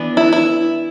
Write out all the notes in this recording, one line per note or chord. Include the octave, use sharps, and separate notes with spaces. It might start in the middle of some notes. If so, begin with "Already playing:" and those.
Already playing: E3 B3 D4
E4
E4